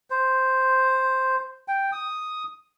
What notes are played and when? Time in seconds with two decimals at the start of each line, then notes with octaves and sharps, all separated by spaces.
0.10 C5
1.68 G5
1.92 D#6